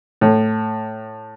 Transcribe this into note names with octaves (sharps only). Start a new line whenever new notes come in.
A2